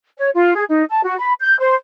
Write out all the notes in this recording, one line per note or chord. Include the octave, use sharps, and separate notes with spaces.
C#5
F4
G#4
D#4
A5
F#4
B5
G6
C5